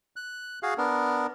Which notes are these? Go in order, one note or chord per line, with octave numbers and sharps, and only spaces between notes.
F#6
F#4 G#4 F5
B3 D4 A#4